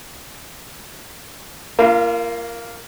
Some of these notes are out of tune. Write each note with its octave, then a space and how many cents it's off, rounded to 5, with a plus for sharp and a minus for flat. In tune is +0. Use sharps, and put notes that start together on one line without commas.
A#3 +0 F4 -40